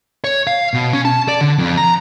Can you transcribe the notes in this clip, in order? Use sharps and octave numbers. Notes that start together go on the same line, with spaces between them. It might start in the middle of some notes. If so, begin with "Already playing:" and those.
C#5
F5
B2
C#4
A5
D5
D3
F2
A#5